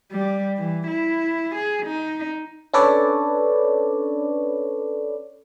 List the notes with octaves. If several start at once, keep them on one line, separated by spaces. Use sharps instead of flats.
G3
E3
E4
G#4
D#4
C#4 D4 A4 B4 C#5 D5